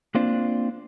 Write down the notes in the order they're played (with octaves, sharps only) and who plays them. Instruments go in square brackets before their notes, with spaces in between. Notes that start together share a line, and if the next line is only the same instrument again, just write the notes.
[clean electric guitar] A#3 C4 D4 F4 C5 D5